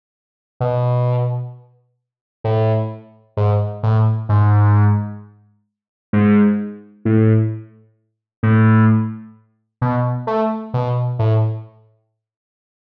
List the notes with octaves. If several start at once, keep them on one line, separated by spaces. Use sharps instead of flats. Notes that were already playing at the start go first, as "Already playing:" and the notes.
B2
A2
G#2
A2
G#2
G#2
A2
A2
B2
A3
B2
A2